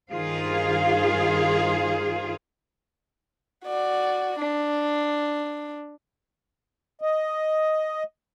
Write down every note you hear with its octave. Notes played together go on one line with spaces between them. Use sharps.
G2 D#3 F4 G#4 C5 F5
F#4 D5
D4
D#5